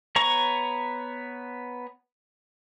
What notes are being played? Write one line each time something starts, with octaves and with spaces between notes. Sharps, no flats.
B3 C#5 A#5 C#6